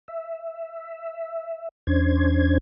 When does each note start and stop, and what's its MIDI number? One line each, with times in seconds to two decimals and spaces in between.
0.08 1.69 76
1.87 2.58 40
1.87 2.58 61
1.87 2.58 62
1.87 2.58 72
1.87 2.58 92